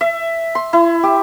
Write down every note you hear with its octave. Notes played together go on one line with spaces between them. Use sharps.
E5
C6
E4
G4